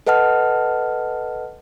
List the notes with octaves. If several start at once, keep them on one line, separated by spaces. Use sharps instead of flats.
A4 B4 D#5 F#5 A5 F6